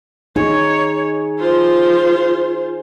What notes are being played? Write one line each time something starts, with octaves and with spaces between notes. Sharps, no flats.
D#4 G#4 C#5
F4 C5